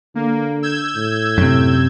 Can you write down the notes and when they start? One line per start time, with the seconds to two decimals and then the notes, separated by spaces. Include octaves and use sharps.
0.15 D3 A#3
0.63 E6 G6 G#6
0.96 A2
1.38 F#2 C3